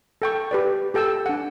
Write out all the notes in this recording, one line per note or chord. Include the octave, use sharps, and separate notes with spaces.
A4 G5 C#6
G4 B4 D5
G4 A4 G5 A5 E6
D4 F#5